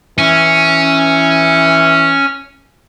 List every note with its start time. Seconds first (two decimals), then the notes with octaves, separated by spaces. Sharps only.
0.19 E3 C#4